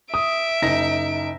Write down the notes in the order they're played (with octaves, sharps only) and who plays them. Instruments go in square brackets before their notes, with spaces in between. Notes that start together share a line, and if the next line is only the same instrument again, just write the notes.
[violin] E5 D7 [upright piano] D#6
[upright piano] F#1 D#4 A#6